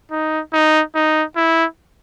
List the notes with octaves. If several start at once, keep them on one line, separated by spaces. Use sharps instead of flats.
D#4
D#4
D#4
E4